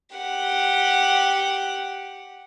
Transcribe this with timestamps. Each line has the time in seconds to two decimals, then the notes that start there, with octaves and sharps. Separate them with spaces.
0.16 G4 F#5